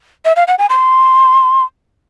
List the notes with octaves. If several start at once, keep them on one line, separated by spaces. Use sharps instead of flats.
E5
F5
F#5
G#5
C6